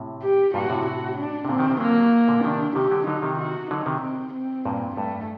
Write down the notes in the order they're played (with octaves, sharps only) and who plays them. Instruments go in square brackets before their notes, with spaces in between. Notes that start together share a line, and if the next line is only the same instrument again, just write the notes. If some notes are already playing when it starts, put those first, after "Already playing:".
Already playing: [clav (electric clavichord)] A2 C3
[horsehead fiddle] G4
[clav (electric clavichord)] G2 A#2 [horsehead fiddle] F#4
[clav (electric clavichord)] A2 C3
[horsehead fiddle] F#4
D4
[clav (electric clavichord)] C3
[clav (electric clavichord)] A#2 D3 [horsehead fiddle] C4
[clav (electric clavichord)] C3 D#3
C3 D#3
[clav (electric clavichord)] D3 F#3 [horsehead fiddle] A#3
[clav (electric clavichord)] A#2 D3
[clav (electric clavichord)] C3 D#3 [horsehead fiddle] D4
[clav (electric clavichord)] C3 D#3 [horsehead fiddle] G4
[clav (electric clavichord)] D3 F#3
[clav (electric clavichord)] D3 F#3 [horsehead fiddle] D#4
[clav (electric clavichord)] C3 D#3
[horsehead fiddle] F#4
[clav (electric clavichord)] D3 F#3 [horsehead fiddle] D#4
[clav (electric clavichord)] C3 D#3
[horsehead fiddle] C4
C4
[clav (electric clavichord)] G2 A#2
[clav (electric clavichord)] G2 [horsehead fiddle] A3